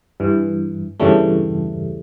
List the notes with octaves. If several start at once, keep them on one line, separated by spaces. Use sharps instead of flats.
G2 E3
E2 G2 C#3 E3 G3 A3